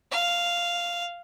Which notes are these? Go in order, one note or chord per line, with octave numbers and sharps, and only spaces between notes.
F5